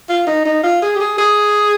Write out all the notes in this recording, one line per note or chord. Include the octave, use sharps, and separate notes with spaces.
F4
D#4
D#4
F4
G#4
G4
G#4
G#4